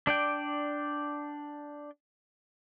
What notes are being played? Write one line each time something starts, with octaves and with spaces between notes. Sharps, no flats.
D4 D5 G5